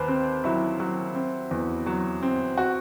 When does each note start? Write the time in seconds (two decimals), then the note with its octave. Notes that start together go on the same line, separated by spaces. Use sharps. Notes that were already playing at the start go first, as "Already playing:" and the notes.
Already playing: D#2 B4 C5
0.08 C4
0.44 F#3 E4
0.80 F#3
1.15 C4
1.51 E2
1.86 F#3
2.23 C4
2.57 F#4